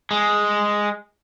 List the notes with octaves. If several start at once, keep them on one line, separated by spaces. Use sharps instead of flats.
G#3